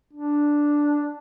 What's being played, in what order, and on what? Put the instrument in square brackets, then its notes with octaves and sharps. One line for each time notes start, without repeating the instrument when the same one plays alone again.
[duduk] D4